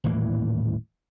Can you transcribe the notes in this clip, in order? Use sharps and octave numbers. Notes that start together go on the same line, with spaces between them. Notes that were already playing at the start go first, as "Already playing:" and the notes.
D#1 A2 E3 A#3